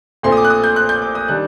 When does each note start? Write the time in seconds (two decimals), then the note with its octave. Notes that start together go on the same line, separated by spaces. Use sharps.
0.23 A#1 A#2 A3 C4 C6
0.32 D#6
0.37 D6
0.45 F#6
0.50 D#6
0.64 G6
0.76 F#6
0.89 G6
1.02 D6
1.15 D#6
1.28 D#3 G3 D4 F#6